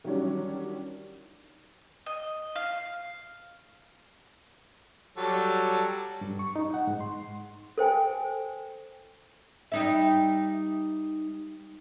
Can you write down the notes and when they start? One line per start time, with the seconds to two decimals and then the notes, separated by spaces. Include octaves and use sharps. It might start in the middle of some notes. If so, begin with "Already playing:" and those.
0.04 D#3 E3 F#3 G3 C#4 D4
2.06 D#5
2.56 F5
5.17 F#3 G3 A4
6.21 G2
6.39 C#6
6.56 D#4
6.74 F#5
6.87 G#2
7.00 C6
7.78 A4 C5 G5 G#5
9.72 G3 D#4 E5